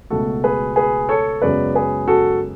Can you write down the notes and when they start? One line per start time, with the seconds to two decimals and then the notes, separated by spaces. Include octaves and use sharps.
0.10 C#2 B2 A3 F#4 A4
0.44 G#4 B4
0.76 G#4 B4
1.09 A4 C#5
1.42 F#2 C#3 G#3 B3 B4 D5
1.75 G#4 B4
2.08 F#4 A4